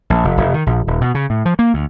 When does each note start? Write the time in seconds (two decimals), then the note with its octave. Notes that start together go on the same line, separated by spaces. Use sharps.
0.10 A#1
0.24 F1
0.37 F1
0.54 D#3
0.66 A#1
0.87 D#1
1.01 B2
1.15 C#3
1.30 A2
1.45 F3
1.59 A#3
1.74 D2